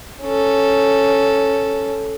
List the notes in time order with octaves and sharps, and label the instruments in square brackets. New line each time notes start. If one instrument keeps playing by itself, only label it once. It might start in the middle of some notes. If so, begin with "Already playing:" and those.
[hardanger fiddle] C#4 A4